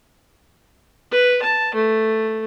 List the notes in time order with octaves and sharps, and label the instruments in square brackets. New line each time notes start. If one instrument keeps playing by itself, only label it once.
[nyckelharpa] B4
A5
A3